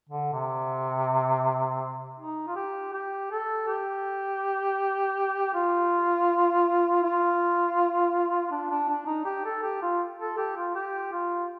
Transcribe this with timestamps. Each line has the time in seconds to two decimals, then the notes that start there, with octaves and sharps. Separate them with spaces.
0.09 D3
0.33 C3
2.20 D#4
2.47 F4
2.56 G4
2.93 G4
3.31 A4
3.68 G4
5.54 F4
7.03 F4
8.52 D4
8.70 D4
8.89 D4
9.07 D#4
9.26 G4
9.45 A4
9.63 G4
9.82 F4
10.18 A4
10.38 G4
10.57 F4
10.75 G4
11.12 F4